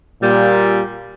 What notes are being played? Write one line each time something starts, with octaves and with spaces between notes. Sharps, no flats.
A#2 G3